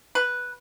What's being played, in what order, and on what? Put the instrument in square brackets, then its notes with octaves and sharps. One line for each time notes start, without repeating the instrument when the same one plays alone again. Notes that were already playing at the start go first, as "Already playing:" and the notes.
[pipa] B4